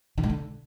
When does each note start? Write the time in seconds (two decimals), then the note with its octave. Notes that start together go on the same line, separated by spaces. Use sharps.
0.18 D3
0.23 G2
0.29 D3